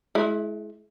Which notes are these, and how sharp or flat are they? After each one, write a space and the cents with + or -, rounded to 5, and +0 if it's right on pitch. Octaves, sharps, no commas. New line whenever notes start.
G#3 +35 E4 +0